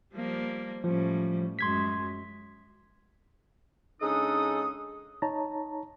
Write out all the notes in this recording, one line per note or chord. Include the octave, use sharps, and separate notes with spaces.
F3 G3 A#3
A2 F3 G3 C#4
F#2 G#3 C6 G#6 B6
C#3 G#3 D4 D#4 A4 D#6
D#4 C#5 A5 A#5